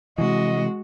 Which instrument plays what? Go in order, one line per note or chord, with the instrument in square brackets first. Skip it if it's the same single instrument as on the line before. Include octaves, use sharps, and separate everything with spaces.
[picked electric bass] C3 E3 [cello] G#3 F#4 [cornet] D#5